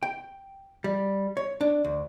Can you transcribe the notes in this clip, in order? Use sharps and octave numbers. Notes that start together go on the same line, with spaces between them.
G5
G3
C#5
D4
D2